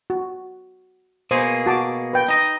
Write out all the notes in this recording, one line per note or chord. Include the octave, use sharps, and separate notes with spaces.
F#4
B2 A#3 G#4 C5
F#4 A5 D6
B4 G5
D#4 D#5